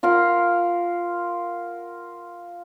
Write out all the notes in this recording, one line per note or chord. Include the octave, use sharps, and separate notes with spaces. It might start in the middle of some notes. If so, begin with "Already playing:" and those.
F4 A#4 F5 F#5